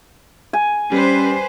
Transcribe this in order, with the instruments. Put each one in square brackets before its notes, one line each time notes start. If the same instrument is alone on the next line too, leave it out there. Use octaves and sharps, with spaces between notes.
[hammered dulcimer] G#5
[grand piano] G3 [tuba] C#4 [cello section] B4 C5